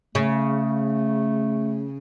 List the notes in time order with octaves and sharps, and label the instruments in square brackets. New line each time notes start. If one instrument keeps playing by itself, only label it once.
[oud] C#3 [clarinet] A3